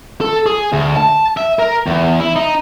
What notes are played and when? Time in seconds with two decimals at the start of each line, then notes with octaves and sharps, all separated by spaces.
0.21 A4
0.46 G#4
0.73 D2
0.97 A5
1.37 E5
1.59 A#4
1.87 E2
2.20 E4
2.36 D#4